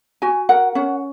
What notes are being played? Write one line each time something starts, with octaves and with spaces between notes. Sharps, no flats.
F#4 G#5
A#4 F#5
C#4 F#5